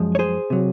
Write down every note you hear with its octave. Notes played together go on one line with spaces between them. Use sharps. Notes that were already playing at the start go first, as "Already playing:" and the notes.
Already playing: F#2 F3 G#3
C#5
G#4 C5
C3 F#3